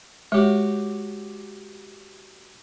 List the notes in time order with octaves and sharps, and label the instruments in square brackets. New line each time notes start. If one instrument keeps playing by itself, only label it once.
[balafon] G#3 [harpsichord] F#4 G4 C#5